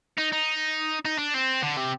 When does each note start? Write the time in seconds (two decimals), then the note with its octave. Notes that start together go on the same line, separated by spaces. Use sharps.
0.18 D#4
0.33 D#4
1.05 D#4
1.19 D4
1.34 C4
1.63 D3
1.77 C3